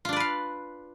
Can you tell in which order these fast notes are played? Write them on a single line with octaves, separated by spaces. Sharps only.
F4 D4 D5 B4 F5